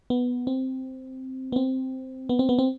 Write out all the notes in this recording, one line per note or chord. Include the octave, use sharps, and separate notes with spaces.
B3
C4
B3
C4
B3
C4
B3
C4